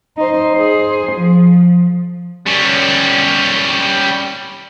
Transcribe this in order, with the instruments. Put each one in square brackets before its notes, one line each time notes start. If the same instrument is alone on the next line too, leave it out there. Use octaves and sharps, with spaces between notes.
[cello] D#4 C5
G#4 C5
F3
[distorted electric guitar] G3 C#4